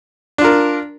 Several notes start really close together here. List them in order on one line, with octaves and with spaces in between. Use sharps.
D4 F4 A#4